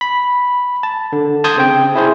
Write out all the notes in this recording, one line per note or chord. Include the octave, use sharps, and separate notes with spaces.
B5
A5
D3
A5 C6 D#6 G6 G#6
C#3 C4 G5
E4 G#4 C5